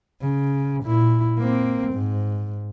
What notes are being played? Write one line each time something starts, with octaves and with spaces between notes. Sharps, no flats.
C#3
A#2 E4
A#3 C4
G#2